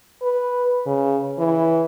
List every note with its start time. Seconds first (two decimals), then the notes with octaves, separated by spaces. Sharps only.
0.22 B4
0.86 C#3
1.39 E3